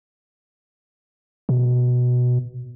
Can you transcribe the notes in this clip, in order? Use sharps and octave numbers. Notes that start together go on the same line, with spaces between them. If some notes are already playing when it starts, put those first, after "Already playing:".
B2